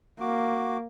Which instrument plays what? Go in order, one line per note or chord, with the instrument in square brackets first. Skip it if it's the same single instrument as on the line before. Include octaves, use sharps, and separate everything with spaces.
[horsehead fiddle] A#3 [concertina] F#4 D6